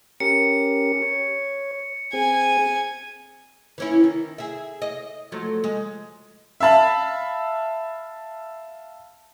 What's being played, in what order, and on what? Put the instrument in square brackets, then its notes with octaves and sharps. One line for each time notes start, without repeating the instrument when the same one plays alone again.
[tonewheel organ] C#4 G4 A#4 [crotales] C#7
[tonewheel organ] C#5
[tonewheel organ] C4 G#4 [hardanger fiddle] G#5
[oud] E3 C#4 E4
D#3
G#4 E5
D#5
F3 F#3 A3
G#3
[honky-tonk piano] E5 F5 A5 B5